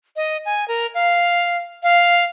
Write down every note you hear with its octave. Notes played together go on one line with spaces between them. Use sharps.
D#5
G#5
A#4
F5
F5